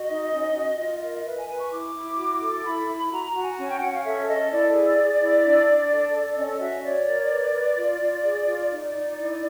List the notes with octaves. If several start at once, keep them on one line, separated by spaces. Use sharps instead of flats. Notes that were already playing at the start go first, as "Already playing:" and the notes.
Already playing: F#4 D#5
D#4
C#4
F#4
F4
A#4
B4 E5
G#5
B4 G#5
C#6
E4 D6
E4
F#4
A4
E4 B5
E4
F#4 A#5
A#5
F#4
G#5
C#4 G#5
G5
C#4 F#5
F5
A4 E5
A4 D#5
E4 D5
G#4
G#4
E4
D4
D4
A4
A4
C#4 D#5
F#4 E5
C#5 D5
A#4
B4
B4
F4
F4
G#4
F4
D#4 D5
D#4
E4